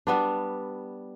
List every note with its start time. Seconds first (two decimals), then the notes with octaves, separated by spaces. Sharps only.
0.07 G3 B3 D4